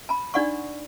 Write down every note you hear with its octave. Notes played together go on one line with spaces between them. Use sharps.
A5 B5
D4 D#4 D5 F#5 C6 C#6